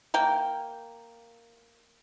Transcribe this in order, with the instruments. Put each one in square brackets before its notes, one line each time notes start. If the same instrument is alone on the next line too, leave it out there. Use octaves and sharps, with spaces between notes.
[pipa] A#3 A#4 G5